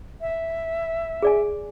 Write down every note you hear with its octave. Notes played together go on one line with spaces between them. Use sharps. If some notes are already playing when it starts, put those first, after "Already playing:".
E5
G#4 D5 G#5